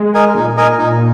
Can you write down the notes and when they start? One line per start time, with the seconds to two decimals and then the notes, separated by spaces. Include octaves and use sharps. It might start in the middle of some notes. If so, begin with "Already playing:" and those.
Already playing: G#3
0.14 A#4 D#5 G#5
0.35 A#2 D#4
0.57 A#4 D#5 G#5
0.79 D#4